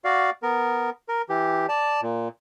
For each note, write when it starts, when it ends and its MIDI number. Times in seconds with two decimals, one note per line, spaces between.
0.04 0.30 66
0.04 0.30 74
0.04 0.30 77
0.43 0.90 59
0.43 0.90 70
1.09 1.22 70
1.29 1.66 52
1.29 1.66 67
1.69 2.01 74
1.69 2.01 81
2.02 2.28 46